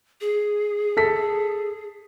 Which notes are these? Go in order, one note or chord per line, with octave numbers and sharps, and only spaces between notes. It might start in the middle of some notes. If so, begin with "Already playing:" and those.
G#4
A4 B6